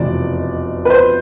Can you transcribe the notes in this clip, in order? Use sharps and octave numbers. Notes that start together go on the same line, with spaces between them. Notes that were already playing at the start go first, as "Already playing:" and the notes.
Already playing: F1 E2 B2 D5
B4
C5